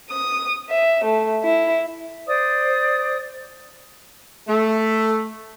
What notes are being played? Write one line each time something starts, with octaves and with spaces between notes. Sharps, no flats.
D#6
E5
A3
E4
C5 D5 D#6
A3